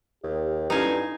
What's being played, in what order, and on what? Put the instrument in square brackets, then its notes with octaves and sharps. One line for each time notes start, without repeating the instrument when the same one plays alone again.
[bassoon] D#2 [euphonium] G4
[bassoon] G2 [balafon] C#4 E4 A4 [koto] D#4 F5 G#5